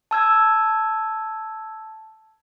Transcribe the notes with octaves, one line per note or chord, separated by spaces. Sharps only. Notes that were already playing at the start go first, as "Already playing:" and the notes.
A5 E6 G#6